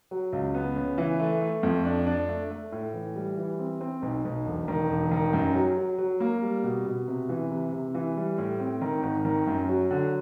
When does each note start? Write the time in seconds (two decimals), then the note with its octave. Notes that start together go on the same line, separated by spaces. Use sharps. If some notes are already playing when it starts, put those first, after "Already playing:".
0.11 F#3
0.33 C#2
0.54 B3
0.76 C#3
0.98 E3
1.20 A3
1.41 A3
1.63 F2
1.85 D4
2.07 D4
2.29 A3
2.50 A3
2.72 A2
2.94 E3
3.16 G3
3.37 E3
3.59 C4
3.81 C4
4.02 B1
4.25 B1
4.46 E1
4.68 D#3
4.90 E1
5.11 D#3
5.33 F#2
5.55 F#3
5.77 F#3
5.98 F#3
6.20 A#3
6.42 G3
6.63 B2
6.86 B2
7.08 C3
7.29 E3
7.51 C3
7.72 C3
7.95 E3
8.16 G3
8.38 A2
8.60 C4
8.82 D#3
9.03 G#1
9.25 D#3
9.47 F#2
9.69 F#3
9.91 D3